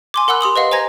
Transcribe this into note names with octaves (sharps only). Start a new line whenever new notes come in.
G#5 C6 D6
A#4 F#5 B5 E6 F#6
G4 C6 D#6 F#7
B4 D#5 F5 F#5
C5 G#5 A#5 G#6 A#6